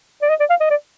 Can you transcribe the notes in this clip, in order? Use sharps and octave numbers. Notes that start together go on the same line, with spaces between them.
D5
D#5
D5
F5
D#5
D5